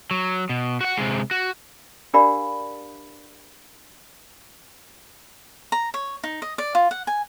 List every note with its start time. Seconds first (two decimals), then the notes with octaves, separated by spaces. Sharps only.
0.11 F#3
0.49 B2
0.81 F#4 F#5
0.97 C3 G#3
1.31 F#4
2.14 D4 G4 A#4 D5 F5 B5
5.72 A#5
5.94 C#5
6.24 D#4
6.42 D#5
6.58 D5
6.75 F4
6.91 F#5
7.07 G#5